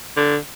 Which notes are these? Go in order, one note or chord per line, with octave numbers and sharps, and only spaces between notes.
D3